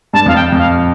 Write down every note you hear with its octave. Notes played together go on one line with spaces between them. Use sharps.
G2 A5
F2 F5
G5
F2
F5